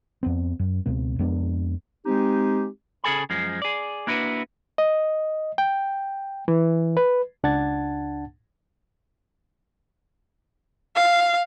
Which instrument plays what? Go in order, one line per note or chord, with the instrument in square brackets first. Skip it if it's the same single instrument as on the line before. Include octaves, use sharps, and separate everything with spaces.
[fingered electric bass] F2 B3 C4
F#2
C#2 B2 C4
F2 G#3 B3 D4
[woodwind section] G#3 C4 D#4 G4
[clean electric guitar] C#3 G#4 A4 G#5 B5
F#2 F3 G#3
G#4 D5
A#3 D4 E4 F#4 G4 B4
[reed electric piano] D#5
G5
E3
B4
C#2 D4 F#5 A5 G#6 A6
[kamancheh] F5